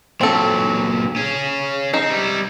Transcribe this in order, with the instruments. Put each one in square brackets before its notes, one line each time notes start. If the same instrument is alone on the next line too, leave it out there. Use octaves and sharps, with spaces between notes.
[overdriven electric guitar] A#2 F#3 [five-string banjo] C4 A4
[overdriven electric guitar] C#4 G#4
[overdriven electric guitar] C4 [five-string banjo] D#4
[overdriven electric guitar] G3 E4